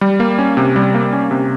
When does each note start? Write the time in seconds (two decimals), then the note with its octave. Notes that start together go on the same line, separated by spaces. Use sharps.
0.01 G3
0.20 A#3
0.39 C#4
0.57 C3
0.76 G3
0.94 A#3
1.13 C#4
1.31 C3